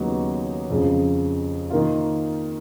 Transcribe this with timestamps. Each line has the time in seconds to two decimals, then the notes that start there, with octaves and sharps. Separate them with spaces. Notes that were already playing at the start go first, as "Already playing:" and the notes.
Already playing: D#2 C#3 F#3 B3 D#4
0.70 F2 C#3 F3
1.70 D#3 A#3 F4